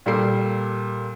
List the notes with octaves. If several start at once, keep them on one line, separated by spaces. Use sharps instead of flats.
A#2 G3 A4 C7